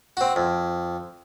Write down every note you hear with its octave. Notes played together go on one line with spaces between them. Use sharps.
C4 F#4
F2